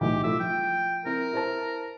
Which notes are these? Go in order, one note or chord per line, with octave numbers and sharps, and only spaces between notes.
B1 A2 E3 G4
F3 A3 E4 E5
F3 G5
C4 E4 A#4
E4 C5 A5